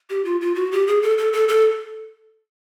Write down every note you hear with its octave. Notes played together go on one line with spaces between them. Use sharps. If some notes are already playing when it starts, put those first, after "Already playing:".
G4
F4
F4
F#4
G4
G#4
A4
A4
A4
A4